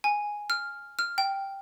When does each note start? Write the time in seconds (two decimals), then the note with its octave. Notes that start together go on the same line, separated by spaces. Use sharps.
0.04 G#5
0.50 F6
0.99 F6
1.18 G5